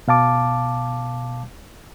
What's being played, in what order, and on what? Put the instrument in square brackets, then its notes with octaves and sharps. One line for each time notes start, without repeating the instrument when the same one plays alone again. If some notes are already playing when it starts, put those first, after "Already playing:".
[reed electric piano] B2 F5 A5 D6